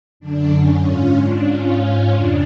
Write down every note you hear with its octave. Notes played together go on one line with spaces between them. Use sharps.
F#2 D3 D4
C#4
G#2 C#4 F4
D4
G#2 C#4 F4
C#4 F4
F2 C#3 D4